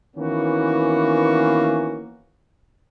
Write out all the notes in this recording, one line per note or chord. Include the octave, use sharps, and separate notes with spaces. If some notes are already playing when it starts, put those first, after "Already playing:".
D#3 E3 A#3 B3 C#4 F#4